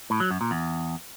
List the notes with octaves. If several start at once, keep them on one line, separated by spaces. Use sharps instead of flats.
A2
F#3
F#2
A#2
E2